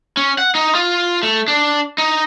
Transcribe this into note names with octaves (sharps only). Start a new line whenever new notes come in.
C#4
F#5
D#4
F4
A3
D4
D#4